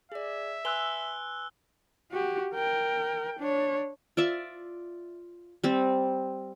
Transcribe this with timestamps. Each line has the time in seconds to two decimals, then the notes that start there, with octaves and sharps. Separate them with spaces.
0.12 G#4 D5 E5
0.65 B4 G#5 C6 E6 F#6 G7
2.12 F#4 G4
2.54 A#4 G5
3.39 D4 C#5
4.17 F4 D5 E5
5.64 G3 C4